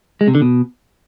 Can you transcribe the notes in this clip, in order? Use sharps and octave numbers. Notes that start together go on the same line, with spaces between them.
G#3
C3
D3
B2